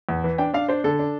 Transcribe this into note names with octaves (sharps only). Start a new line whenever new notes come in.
E2
E3
D4 G5
D4 F5
D4 C5
D3 A4
D4